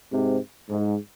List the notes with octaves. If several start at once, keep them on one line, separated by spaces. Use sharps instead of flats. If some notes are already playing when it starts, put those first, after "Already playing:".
G#2 C3
G#2